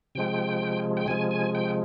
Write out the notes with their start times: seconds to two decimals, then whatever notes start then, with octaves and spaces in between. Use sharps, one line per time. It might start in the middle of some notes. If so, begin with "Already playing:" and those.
0.15 C3 F3 G#3 G5
0.97 G5
1.07 C3 F3 G#3 G#5
1.31 G#5
1.55 G5